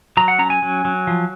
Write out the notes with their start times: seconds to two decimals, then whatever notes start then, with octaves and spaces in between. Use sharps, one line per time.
0.17 F#3 A#5
0.28 F#5
0.39 C#4 A#5
0.50 G#5
0.62 F#3
0.85 F#3
1.07 F3